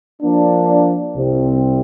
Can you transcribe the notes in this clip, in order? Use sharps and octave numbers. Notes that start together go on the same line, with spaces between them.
F3 A#3 D4
C2 C3 G3 C4